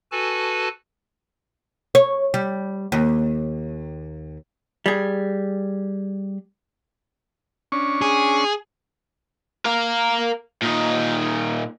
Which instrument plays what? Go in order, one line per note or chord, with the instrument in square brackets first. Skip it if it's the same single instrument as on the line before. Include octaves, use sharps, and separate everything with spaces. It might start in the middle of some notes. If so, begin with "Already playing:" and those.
[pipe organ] F#4 A4 B4 G#5 A5
[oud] C#5
G3
D#2
[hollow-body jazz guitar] G3 G#4
[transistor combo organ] C#4 D4 C#6
[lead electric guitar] G#4
[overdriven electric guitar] A#4 F5
A#2 D#4